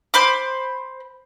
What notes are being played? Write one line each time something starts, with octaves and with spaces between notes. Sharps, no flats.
C5 B5 D6